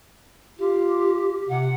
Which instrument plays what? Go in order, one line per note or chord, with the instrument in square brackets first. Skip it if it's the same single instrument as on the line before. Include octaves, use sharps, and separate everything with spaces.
[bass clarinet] F4 [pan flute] G4
[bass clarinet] C3 [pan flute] F#5